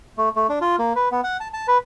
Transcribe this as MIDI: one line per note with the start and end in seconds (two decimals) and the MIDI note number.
0.17 0.29 57
0.36 0.47 57
0.49 0.59 62
0.61 0.76 65
0.79 0.93 58
0.96 1.09 71
1.12 1.21 59
1.24 1.37 78
1.40 1.48 81
1.53 1.67 81
1.68 1.78 71